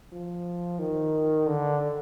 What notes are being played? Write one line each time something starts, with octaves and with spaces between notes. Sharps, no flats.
F3
D#3
D3